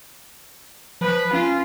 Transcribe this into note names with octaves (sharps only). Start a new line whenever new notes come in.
F3 B4
C#4 F4